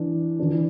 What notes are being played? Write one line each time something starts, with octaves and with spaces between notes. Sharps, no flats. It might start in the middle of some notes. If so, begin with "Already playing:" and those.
Already playing: E3 D4
E3 D4